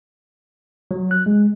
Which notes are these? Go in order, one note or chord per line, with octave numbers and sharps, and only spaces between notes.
F#3
F#6
G#3